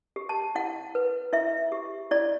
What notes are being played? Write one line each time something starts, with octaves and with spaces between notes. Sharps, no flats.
G4
A5
E4 F#5
B4
E4 E5
G4
E4 D5